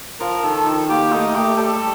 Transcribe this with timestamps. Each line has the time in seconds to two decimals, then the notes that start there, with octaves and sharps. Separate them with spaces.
0.20 F3 A#4
0.43 D#3 A4
0.66 D#3
0.89 A#3 G4
1.12 A3 D#4
1.35 A3 G4
1.58 G3 A4